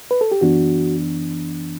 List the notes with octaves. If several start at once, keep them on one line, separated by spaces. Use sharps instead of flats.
B4
A4
G4
F#2 E3 B3 D4 F#4